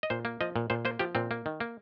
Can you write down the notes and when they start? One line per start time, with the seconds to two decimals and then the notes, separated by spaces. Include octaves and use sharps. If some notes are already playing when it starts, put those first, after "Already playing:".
0.03 D#5
0.10 A#2 C5
0.25 A#3
0.41 F3 D#5
0.56 A#2
0.70 A#2 C5
0.85 A#3 C5
0.99 F3 G4
1.15 A#2 C4
1.31 A#3
1.46 D#3
1.60 A#3